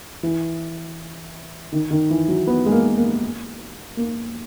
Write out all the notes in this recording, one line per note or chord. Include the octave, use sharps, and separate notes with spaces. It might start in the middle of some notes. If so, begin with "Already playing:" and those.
E3
D#3
D#3
E3
F#3
B3
G#3
A#3
A#3
A#3